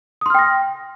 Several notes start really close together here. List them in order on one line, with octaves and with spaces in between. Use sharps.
D#6 C6 F6 G5 A#6